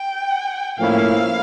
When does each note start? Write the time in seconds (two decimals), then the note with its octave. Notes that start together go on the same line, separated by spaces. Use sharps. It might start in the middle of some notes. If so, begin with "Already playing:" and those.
Already playing: G5
0.78 A2 F3 A#3 C#4 E4 F5